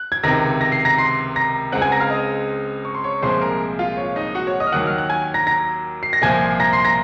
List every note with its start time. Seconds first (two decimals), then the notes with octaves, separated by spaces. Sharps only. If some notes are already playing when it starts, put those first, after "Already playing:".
Already playing: F#6
0.12 G#6
0.23 C#2 C3 D#3 A#5 A#6
0.61 A#6
0.72 C7
0.85 A#5 A#6
0.98 C6 C7
1.36 A#5 A#6
1.72 C#2 C#3 G#3 C4 F#5 F#6
1.82 G#5 G#6
1.92 A#5 A#6
2.00 F5 F6
2.10 D#5 D#6
2.85 C#6
2.95 C6
3.04 C#5 C#6
3.22 C2 A#2 F3 G#3 C4 C5 C6
3.41 A#4 A#5
3.79 F4 F5
3.97 C#5
4.16 D#4 D#5
4.35 F#4 F#5
4.47 C#5 C#6
4.60 D#5 D#6
4.67 F6
4.72 D#2 D#3 F#3 F#5 F#6
4.87 F6
4.98 F#6
5.10 G#5 G#6
5.34 A#5 A#6
5.47 A#5 A#6
6.03 C7
6.13 A#6
6.22 C2 A#2 F3 G#5 G#6
6.60 A#5 A#6
6.73 C6 C7
6.85 A#5 A#6